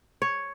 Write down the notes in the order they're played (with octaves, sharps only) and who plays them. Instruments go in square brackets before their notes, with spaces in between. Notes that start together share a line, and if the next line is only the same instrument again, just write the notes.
[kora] C#5